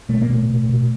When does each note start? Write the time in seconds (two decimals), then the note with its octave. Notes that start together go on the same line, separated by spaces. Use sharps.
0.09 B2 A3
0.21 A#3
0.29 B2 A3
0.50 B2
0.69 B2